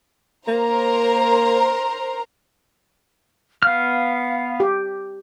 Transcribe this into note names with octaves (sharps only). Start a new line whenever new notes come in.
A#3 A#4 C5 A#5
B3 F5 F6
G4